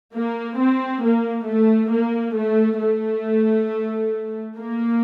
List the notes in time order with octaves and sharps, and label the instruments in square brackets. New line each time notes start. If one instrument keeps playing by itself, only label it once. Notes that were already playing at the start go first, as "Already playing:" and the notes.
[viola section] A#3
C4
A#3
A3
A#3
A3
A3
A#3